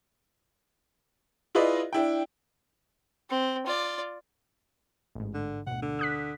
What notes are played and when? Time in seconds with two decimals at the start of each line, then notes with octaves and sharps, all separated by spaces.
1.55 E4 F4 G#4 B4 D5 D#5
1.93 D4 E4 G5
3.30 C4
3.66 F4 D5
5.15 A1 G#2
5.34 D3
5.67 D2 B2 F#5
5.82 D3
5.99 D#6 F#6 B6